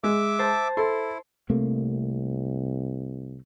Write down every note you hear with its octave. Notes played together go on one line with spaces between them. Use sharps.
G#3 E5 D6
C5 A5
E4 A4 C6
C2 C3 A3 A#3